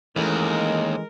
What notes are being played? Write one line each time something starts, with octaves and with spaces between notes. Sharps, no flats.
D#2 E3 G#3 A3 C#4 A#4